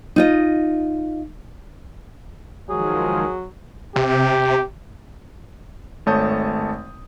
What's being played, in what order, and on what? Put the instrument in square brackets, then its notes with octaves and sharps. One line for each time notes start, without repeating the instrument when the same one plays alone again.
[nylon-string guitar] D#4 F4 D#5
[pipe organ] D#3 F3 G#3 [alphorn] F#3 [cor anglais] G#4
[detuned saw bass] C3 [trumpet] G4
[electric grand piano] G#1 A3 C#5 A5 D#6 G6